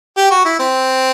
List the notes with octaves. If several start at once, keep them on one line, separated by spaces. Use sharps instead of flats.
G4
F#4
E4
C4